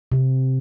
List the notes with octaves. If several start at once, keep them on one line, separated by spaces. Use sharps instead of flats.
C3